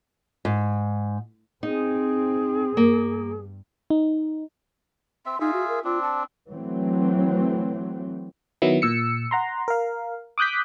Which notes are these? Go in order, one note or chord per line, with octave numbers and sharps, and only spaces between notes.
G#2
C4 D#4 G#4
G2 A#3
D#4
C4 E5 C6
D#4 F4 G#4 E5
F#4
A#4
C4 D4 F4
A5
E3 F#3 A3 C4
D#3 F#3 B3 E4
A#2 E6 C#7
F#5 A#5 C6
A#4 F5
D6 D#6 F#6 G6 B6